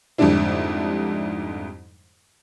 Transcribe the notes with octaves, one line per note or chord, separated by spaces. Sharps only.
F2 G#2 D3 G3 D4 E4